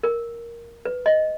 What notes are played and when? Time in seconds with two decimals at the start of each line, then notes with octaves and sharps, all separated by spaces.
0.03 A#4
0.85 B4
1.06 D#5